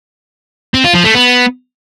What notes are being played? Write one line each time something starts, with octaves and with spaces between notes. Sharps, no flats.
C4
F4
F3
A3
B3